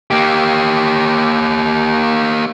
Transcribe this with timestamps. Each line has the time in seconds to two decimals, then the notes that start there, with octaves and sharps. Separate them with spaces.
0.11 A#3 G4